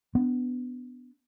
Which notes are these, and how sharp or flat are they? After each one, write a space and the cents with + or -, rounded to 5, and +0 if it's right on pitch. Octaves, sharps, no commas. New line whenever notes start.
B3 +15 D4 +0